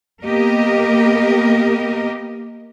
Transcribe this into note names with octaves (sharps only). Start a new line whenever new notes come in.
A#3 B3 G4 A#4 D#5